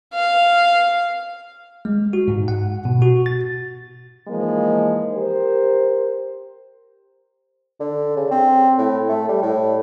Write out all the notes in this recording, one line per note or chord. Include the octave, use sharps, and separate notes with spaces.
F5
G#3
F#4
G#2
F#5
B2
F#4
A6
E3 F3 G#3 A#3 D#4
G4 A#4 C5
D3
C#3
C4
A2
A3
G3
A2